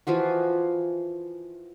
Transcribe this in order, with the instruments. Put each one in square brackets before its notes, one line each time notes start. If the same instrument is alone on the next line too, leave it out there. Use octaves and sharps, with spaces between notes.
[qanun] E3 F3 F4 F#4